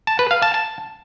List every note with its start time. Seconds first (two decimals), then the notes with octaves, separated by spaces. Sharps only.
0.07 A5
0.19 B4
0.31 F5
0.42 A5
0.54 A5